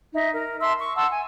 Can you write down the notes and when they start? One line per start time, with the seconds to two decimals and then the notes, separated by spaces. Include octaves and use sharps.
0.13 D#4 E5
0.32 A#4
0.61 E5 A5 C6 E6
0.79 C#6
0.96 F#5 A5 C6 E6
1.09 G#5